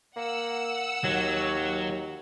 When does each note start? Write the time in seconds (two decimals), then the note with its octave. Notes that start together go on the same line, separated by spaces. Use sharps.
0.16 A#3 F#5 E6
1.04 D#2 F#3